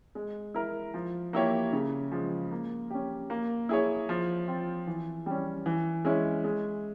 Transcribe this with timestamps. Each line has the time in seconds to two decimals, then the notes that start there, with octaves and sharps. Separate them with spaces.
0.15 G#3
0.54 E4 A#4
0.94 F3
1.33 A#3 E4 G4 C#5
1.73 C#3
2.12 F3 G#3
2.51 A#3
2.90 C#4 G4
3.30 A#3
3.69 E4 G#4 C#5
4.09 F3
4.47 C4 F4
4.87 E3
5.26 G3 C#4
5.66 E3
6.05 G#3 C#4 E4
6.44 G#3